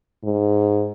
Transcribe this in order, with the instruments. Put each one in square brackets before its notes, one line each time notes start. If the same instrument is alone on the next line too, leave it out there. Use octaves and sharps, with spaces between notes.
[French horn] G#2